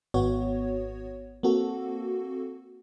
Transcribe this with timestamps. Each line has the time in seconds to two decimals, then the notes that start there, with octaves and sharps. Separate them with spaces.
0.14 G#1 B3 F#4 C#5
1.43 A#3 C4 F#4 A4